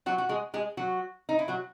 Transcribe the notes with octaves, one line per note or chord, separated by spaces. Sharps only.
F#3 F#4
F#4
G#3 G#4
G#3 G#4
F#3 F#4
D#4
E4
F#3 F#4